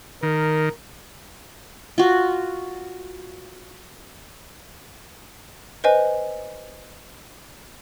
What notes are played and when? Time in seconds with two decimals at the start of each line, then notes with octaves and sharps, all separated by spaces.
0.23 D#3 A#4
1.98 F4 F#4
5.84 B4 C5 D#5 G#5